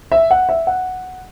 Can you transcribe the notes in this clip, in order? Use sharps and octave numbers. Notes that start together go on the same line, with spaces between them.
E5
F#5
E5
F#5